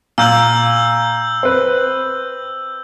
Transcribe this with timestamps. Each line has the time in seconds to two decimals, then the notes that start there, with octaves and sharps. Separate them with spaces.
0.18 A#2 E6 G6 F#7
1.43 C4 B4